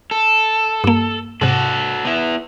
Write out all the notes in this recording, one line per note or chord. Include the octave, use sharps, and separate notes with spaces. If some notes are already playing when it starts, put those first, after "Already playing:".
A4
G2 A#3
G#2 C3 F#4 A4
B3 E4